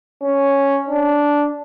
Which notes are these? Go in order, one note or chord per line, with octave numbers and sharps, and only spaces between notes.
C#4
D4